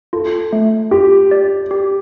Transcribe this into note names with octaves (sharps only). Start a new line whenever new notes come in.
F4 A4
A3
F4 G4
D5
G4